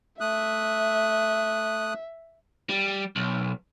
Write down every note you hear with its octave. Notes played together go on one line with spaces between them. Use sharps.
A3 E5 D#6 F#6
G3
B1